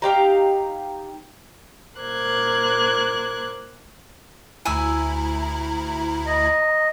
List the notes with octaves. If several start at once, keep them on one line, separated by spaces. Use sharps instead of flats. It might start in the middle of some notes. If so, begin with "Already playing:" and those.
D#4 G4 F5 A#5
A#2 A#4 C5 D6 F#6 G#6
D2 E4 G#5 A#5 E6
D#5